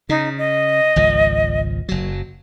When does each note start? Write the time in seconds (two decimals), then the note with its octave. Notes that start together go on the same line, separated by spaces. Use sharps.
0.09 C#3 D#4
0.38 D#5
0.96 G#1 C#2 F3
1.89 F#1 F#3